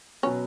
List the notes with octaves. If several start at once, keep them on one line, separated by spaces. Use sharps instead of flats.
B2 F#3 B3 C#4